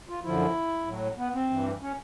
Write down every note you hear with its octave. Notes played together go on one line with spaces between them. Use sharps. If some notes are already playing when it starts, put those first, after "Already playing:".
F4
F#2 D3 F3 E4
A2 F#3
B3
C4
G2 E3
C#4